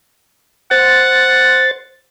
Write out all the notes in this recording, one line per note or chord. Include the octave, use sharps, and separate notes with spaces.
C5 F#5 A6